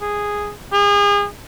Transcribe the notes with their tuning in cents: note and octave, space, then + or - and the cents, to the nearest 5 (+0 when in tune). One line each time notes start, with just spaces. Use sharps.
G#4 -5
G#4 -35